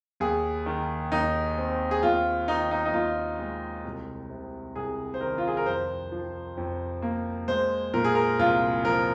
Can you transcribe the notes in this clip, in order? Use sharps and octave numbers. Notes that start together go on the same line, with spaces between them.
D#2 G#4
D#3
D#2 D#4
C4
G#4
D#2 F4
D#3 D#4
D#4
D#4
D#2 F4
G#3
C2
C3
C2 G#4
C5
D#3 A#4
F4
G#4
A#4
F2 C5
F3
F2
A#3
G#3 C5
A#2 A#4
G#4
A#4
C2 F4
F3 A#4